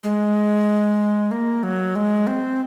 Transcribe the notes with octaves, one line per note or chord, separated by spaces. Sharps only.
G#3
A#3
F#3
G#3
C4